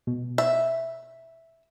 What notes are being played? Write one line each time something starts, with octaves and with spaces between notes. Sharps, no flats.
B2
E5